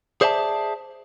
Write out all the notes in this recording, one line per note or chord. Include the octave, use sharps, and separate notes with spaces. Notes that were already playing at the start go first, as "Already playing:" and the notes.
G#4 C5 D5 E5 G5 A5